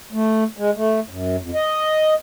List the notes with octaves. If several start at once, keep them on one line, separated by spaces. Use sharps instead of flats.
A3
G#3
A3
F#2
F2
D#5